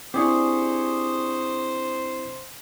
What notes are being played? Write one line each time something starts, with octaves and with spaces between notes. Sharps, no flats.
C4 D4 E4 G4 G#4 C5 C#5